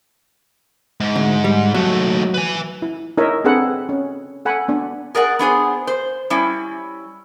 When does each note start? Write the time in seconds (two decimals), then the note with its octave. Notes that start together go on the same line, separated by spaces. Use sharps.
1.00 G#2
1.16 D2
1.44 G3
1.74 D#2 F#3 A3
2.34 B4 G#5
2.82 E4
3.18 D#4 E4 A#4 C#5 D#5 E5
3.44 C4 D4 G#4 A4 B4 F#5
3.89 C#4
4.45 A4 F#5 G#5 B5
4.68 B3 D4
5.15 G#4 A#4 D5 F#5
5.39 B3 D4 G#4 C5
5.87 C5
6.30 G3 C#4 E4